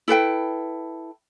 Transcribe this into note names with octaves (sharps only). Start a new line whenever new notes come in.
E4 A4 B4 G5